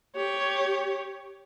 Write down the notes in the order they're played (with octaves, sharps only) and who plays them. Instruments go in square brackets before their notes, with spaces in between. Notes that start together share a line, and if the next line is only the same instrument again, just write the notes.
[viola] G4 C#5